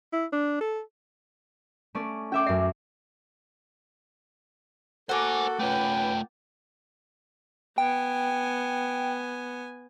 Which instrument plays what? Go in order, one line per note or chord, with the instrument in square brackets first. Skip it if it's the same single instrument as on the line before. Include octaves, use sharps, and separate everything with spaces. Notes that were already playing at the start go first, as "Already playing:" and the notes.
[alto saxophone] E4
D4
A4
[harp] A3 C#4 D5
[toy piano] C#4 D6 [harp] D5 E5 G5
[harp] F#2 C7 [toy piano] E5
[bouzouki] A#3 F#5 [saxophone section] F#4 A4 [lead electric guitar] C5 G#5
[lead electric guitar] A3 F4 [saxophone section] C#4 B4 [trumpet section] G5
[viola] B3 G#5 [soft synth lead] G5